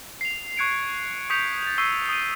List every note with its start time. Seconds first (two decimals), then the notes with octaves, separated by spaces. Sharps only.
0.21 C7 F7
0.57 C#6 F#6 G#6 C#7 D7 F7
1.30 C#6 D#6 G6 B6 C#7 F7
1.62 A6 F7
1.78 C#6 E6 B6 C7 D#7 G7
2.09 D#6 D#7